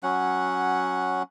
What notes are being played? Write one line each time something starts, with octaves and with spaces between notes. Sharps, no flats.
F#3 C#4 F#5